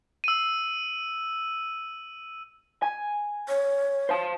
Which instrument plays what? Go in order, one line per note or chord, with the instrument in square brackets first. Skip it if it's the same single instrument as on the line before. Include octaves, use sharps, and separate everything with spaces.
[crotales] E6 D#7
[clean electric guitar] G#5
[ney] C#5
[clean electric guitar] C5 F5 A5